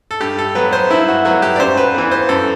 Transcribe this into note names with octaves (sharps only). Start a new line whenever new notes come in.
A4
G2 G4
A4
F#3 B3 B4
C5
G2 E4
F#4
F#3 B3 F#4
G4
D5
F#2 C5
B4
E3 B3
C5
F#2 A4